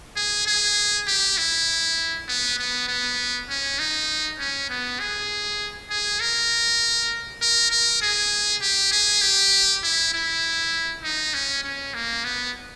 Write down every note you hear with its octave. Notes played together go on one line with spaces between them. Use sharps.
G#4
G#4
G4
E4
B3
B3
B3
C#4
D#4
C#4
B3
G#4
G#4
A#4
A#4
A#4
G#4
G4
G#4
G4
E4
E4
D#4
C#4
C#4
A#3
B3